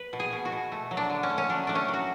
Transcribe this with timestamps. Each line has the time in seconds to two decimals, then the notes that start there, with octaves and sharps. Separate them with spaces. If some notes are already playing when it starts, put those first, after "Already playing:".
Already playing: B4
0.13 B2
0.20 G#4
0.32 B2
0.45 F#4
0.52 B2
0.72 A3
0.91 F#3
0.97 D4
1.10 D3
1.23 C#4
1.30 A3
1.38 C#4
1.49 F#3 D4
1.67 A3 D4
1.75 C#4
1.88 F#3
1.93 F#4